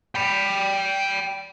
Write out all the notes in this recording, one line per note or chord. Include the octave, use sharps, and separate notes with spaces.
G5 B5